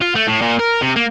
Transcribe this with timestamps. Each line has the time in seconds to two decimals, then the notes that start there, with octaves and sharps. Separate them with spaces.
0.02 F4
0.16 A3
0.28 A2
0.42 A#2
0.60 A#4
0.82 C3
0.96 A#3